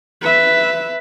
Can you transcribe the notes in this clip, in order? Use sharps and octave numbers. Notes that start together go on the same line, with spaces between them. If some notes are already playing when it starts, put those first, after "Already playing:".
B4 E5